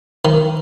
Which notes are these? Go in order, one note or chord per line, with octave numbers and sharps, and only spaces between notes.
D#3